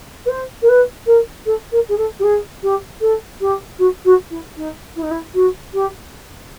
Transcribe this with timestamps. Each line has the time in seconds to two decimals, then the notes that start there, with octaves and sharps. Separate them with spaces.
0.26 B4
0.29 C5
0.62 A#4
0.69 B4
1.06 A#4
1.46 A4
1.72 A#4
1.89 G#4
1.98 A4
2.19 G4
2.24 G#4
2.63 G4
3.01 A4
3.41 G4
3.79 F#4
4.05 F#4
4.30 E4
4.57 D#4
4.96 E4
5.03 D#4
5.11 E4
5.34 F#4
5.74 G4